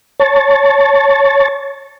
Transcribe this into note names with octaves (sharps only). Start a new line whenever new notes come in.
C#5 A5